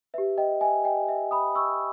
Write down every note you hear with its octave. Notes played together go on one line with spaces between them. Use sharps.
G4 B4 E5
D#5 G5
E5 G#5
D#5 G5
E5
B5 D#6
C#6 E6